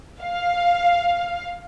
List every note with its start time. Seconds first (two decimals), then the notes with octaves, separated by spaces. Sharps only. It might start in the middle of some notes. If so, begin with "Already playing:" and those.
0.22 F5